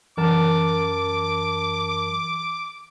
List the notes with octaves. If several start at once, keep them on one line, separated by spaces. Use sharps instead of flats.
F#2 E3 A#4 A5 D6